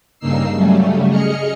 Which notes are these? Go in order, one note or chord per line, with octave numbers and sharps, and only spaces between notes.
G2 C#3 A#3 D#4 E6 C7
C#3 F#3 G3 A3 C#4
G#4 D#5 F6 C#7